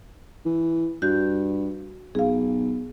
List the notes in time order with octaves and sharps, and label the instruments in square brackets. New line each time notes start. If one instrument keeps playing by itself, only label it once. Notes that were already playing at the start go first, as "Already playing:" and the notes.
[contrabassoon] E3
[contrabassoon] G2 [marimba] F#4 G6
[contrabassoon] B1 [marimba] G#4 F5